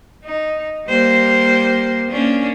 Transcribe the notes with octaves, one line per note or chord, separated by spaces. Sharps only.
D#4
G3 A#3 C5
A#3 C#4 D4